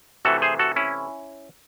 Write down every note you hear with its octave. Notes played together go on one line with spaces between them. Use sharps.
C3 E3 A3 F#4 A4
G#4 C5
F#4 A4
C#4 E4